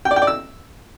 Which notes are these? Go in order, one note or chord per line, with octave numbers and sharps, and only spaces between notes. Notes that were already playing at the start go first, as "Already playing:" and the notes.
G5
D5
G5
D5
E6